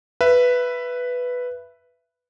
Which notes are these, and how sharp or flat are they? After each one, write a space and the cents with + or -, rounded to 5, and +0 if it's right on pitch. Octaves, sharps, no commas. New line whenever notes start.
B4 +0 E5 +20